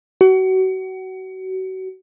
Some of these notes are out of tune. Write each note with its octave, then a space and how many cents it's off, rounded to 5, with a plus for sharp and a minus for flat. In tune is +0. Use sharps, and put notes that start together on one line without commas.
F#4 +30